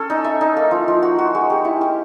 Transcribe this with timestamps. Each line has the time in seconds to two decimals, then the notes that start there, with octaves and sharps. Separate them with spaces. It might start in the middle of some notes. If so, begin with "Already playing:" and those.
Already playing: C#4 A4
0.10 D#4
0.24 E5
0.41 D#4
0.57 A#3
0.71 F3
0.88 F3
1.02 F#4
1.18 F#4
1.35 G#3
1.50 G4
1.65 E4
1.81 G4